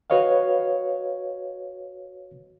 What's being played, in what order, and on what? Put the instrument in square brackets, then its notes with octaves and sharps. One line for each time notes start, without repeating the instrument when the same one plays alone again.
[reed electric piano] F#4 B4 C#5 D#5 F5